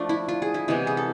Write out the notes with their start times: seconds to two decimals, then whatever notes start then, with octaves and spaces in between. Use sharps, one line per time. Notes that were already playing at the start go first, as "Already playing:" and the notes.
Already playing: F3 A3 D4
0.09 E4
0.28 F4
0.42 G#4
0.54 E4
0.68 C3 E3 G#3 B3
0.87 G#4
0.97 A4